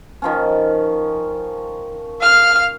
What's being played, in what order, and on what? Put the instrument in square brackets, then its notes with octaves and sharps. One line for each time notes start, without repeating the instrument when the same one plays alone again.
[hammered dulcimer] D#3 F3 C#4
[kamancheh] F5 F6